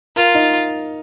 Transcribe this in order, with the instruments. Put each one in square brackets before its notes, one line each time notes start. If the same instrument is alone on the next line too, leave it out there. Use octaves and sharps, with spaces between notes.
[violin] F4 [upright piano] A#4
[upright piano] D#4